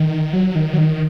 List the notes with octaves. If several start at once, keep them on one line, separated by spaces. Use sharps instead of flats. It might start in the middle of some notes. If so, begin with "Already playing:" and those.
Already playing: D#3
F#3
D#3
F#3
D#3